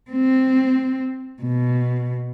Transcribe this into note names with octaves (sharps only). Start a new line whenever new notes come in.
C4
B2